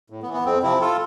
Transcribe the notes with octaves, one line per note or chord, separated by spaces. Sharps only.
A2
B3
E3
B3
F2 C4
C3 F3 C4 E4
F4 A4